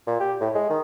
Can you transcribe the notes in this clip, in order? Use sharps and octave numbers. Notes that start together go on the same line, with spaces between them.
A#2
G4
A2
G#3
D#3